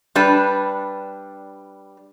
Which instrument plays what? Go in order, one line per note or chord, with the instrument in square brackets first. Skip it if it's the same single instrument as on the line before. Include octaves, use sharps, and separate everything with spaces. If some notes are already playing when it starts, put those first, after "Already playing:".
[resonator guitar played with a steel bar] G3 D4 B4